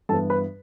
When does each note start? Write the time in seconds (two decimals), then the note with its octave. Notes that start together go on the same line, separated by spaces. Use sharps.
0.09 G2 E3 B3 A4 A5
0.30 B4 B5